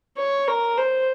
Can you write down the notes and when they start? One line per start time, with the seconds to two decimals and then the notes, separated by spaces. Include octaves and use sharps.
0.17 C#5
0.48 A#4
0.78 C5